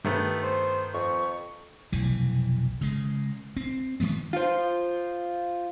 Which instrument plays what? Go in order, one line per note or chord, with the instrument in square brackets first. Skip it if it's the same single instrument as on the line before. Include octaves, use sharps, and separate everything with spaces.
[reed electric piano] G2 [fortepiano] D#3 A3 B3
[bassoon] C5
[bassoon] F2 [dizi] C#6
[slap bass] F1 B1 E3
C#3 G#3
C4
D#3 E3 G#3 B3
[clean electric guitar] F4 C5